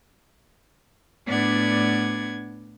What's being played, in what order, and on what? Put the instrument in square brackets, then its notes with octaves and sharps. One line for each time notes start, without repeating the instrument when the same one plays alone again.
[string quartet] A2 B3 D4 D5 F#5 G#6